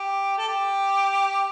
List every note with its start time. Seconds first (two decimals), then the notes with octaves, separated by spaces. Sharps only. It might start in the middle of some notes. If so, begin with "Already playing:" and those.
Already playing: G4
0.38 A4
0.48 G4